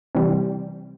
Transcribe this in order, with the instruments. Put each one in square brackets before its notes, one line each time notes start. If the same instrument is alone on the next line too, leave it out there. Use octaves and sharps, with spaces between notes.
[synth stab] C3 E3 G3